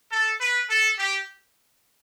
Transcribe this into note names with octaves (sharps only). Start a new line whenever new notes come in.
A4
B4
A4
G4